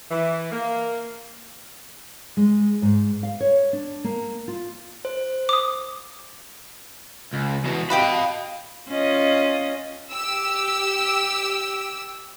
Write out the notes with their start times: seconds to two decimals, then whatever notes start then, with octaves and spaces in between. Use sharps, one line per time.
0.11 E3
0.52 A#3
2.37 G#3
2.82 G#2
3.23 F5
3.40 C#5
3.73 D4
4.04 A#3
4.48 F4
5.05 C5
5.49 D6 D#6
7.33 C#2
7.64 E2 B2
7.90 F#4 G4 D#5 F5 G5 B5
8.88 C#4 F4 D#5
10.12 G4 E6